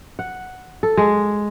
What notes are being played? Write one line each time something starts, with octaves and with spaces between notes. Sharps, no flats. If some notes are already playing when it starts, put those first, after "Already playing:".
F#5
A4
G#3